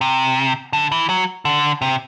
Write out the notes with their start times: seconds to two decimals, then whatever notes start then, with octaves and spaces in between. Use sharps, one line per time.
0.01 C3
0.73 D3
0.92 E3
1.09 F#3
1.45 D3
1.82 C3